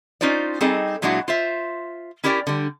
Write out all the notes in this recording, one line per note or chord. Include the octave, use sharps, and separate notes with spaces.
C#4 D#4 F4 C5 D5
G3 C4 D#4 G#4 A4 D#5
A#2 F#3 G#3 D4 E4 F#4
F4 C5 E5
C#4 E4 G4 A#4 D5 G5
D3 G3